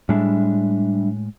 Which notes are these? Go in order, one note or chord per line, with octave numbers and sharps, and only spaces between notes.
A2 G3 G#3 D4 E5